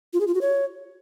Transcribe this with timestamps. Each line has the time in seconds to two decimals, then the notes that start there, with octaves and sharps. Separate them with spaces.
0.13 F4
0.20 G#4
0.27 F4
0.34 F#4
0.41 C#5